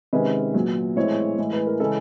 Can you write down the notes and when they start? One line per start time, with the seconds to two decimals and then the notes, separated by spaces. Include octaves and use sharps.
0.13 C3 D#3 G#3 C#4 B4
0.54 A#2 F#3 B3
0.96 A2 E3 G#3 C4 C#5
1.38 A2 E3 G#3
1.53 B4
1.67 A#4
1.80 C#3 E3 G#3 C#4 A4